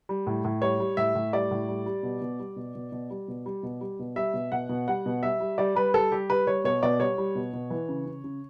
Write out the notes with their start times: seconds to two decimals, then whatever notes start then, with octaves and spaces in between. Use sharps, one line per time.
0.09 G3
0.27 A2
0.45 A2
0.62 G3 C#5
0.80 G3
0.97 A2 E5
1.15 A2
1.33 G3 D5
1.51 A2
1.68 G3
1.86 G3
2.03 B2
2.21 B2
2.39 G3
2.56 B2
2.75 B2
2.92 B2
3.10 G3
3.28 B2
3.46 G3
3.63 B2
3.81 G3
3.99 B2
4.16 G3 E5
4.34 B2
4.52 B2 F#5
4.69 B2
4.87 G3 F#5
5.06 B2
5.23 G3 E5
5.40 G3
5.58 G3 D5
5.75 G3 B4
5.94 G3 A4
6.12 G3 G4
6.30 G3 B4
6.47 G3 C#5
6.64 B2 C#5
6.83 B2 D5
7.00 G3 C#5
7.18 G3
7.35 B2
7.53 B2
7.70 E3
7.89 C#3
8.06 C#3
8.24 C#3